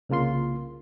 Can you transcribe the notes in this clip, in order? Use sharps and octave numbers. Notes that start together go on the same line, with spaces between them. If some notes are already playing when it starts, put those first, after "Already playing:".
C2 C#3 A#3 F4 C6